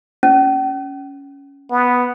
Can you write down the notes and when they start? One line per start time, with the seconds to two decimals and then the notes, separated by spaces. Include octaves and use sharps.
0.23 C#4
1.71 B3